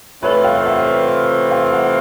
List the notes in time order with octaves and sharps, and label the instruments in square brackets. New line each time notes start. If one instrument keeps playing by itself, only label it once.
[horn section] C3 E3 A3 C4 F4 [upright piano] B4 C#5
[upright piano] F5 G5
E5 F#5
F5 G5
E5 F#5